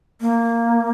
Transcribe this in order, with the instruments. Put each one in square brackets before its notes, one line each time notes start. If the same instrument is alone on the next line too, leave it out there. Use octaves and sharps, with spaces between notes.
[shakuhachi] A#3